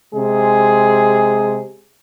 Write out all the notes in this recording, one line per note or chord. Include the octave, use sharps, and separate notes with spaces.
C3 G#3 G#4